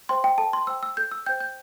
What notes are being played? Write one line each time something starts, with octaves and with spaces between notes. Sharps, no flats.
C5 G5 C6
G5
A4 A5
C6
C5 G5 E6
E6
A4 G6
E6
C5 G5 G6
G6